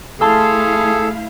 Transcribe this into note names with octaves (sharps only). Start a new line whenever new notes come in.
A3 E4 G#4 A4 F5 A5 C6 E6